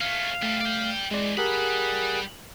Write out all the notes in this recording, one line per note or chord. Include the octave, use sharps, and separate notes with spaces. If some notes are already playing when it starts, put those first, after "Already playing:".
A3 C#4 F5
G3 A3 A4 F6
D5 G5
E3 G#3 C4 D5
G3 G4 G#4 A#4 F#5 B5